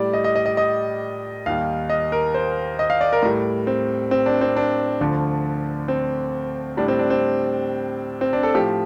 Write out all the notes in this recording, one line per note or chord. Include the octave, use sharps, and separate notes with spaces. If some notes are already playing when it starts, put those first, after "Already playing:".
Already playing: A2 G3 D5
D#5
D#5
D#5
D#5
D#5
D#2 D#3 G3 F5
D#5
A#4
C5
D#5
F5
D5
A#4
A2 G3
C4
C4
D4
C4
D4
D2 D3 F3
C4
A2 G3 D4
C4
D4
C4
C4
D4
A4
A2 F3 G4